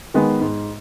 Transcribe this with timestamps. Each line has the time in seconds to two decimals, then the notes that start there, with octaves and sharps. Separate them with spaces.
0.14 D#3 G#3 B3
0.41 G#2